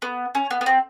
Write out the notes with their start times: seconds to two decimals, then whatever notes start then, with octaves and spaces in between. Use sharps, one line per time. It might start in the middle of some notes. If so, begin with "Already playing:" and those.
0.02 B3
0.35 C#4
0.51 B3
0.61 B3
0.66 C4